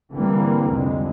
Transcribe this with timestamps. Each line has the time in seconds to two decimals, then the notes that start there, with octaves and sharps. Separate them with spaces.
0.12 D3 E3 G3 A#3 C4
0.70 C2 F2 D3 G#3